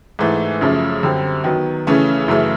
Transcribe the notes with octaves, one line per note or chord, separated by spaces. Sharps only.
G#2 E3 A3
F#2 C#3 F3 A3
F#2 D3 G3 C4
D#3 F#3 B3
C#3 E3 A3 C#4 E4
F#2 C#3 E3 A3